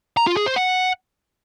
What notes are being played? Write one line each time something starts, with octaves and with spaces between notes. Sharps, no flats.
A#5
F4
G#4
C5
F#5